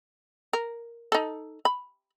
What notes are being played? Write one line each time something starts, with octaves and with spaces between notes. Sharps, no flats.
A#4
D#4 A4
B5